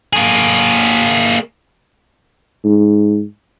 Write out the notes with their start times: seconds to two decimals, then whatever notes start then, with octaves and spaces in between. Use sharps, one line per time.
0.13 A#3 G#4
2.64 G#2